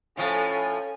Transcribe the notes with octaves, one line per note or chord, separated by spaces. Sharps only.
A2 F3 C#4 A4 C#5 F5 G#5